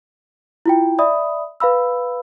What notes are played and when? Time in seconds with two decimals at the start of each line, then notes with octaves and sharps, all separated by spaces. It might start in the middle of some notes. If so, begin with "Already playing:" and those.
0.66 E4 F4 G5
0.99 D5 E5 B5 D#6
1.60 B4 F5 B5 E6